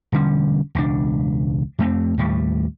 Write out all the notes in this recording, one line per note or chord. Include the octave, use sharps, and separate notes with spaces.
E1 D3 G3 C#4
E1 C#2 C#3 D4
F2 A3 C4
D#2 A2 G3